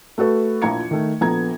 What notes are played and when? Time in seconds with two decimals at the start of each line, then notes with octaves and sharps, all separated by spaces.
0.18 A3 F#4 A4 B4
0.62 A#1 F3 E4 A#5 G#6 C#7
0.91 D#3 A3
1.21 A#1 B3 A4 A#5 G#6